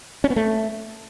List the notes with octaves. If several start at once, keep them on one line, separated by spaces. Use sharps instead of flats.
C#4
B3
A3